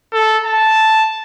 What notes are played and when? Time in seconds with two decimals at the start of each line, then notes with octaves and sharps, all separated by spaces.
0.13 A4
0.44 A5